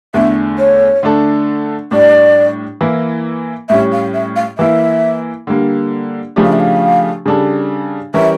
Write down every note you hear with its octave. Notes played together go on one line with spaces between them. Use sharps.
E2 D3 A3 E5
C#5
D3 A3 D4 A4
A2 G3 D4 D5
E3 A#3 E4
A2 G3 C#4 E5
F5
E5
F5
E3 A#3 E4 E5
D3 G3 A#3
C#3 F3 A3 D4 G4
F5
E5
F5
C#3 G3 D4 A4
E3 G3 C#4 G4 A#4 E5